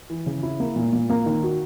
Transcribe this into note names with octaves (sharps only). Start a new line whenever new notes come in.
E3
C#3
E4
A#3
A#2
A#2
A#3
D#3
F#4